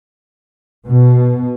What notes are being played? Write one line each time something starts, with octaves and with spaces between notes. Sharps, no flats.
B2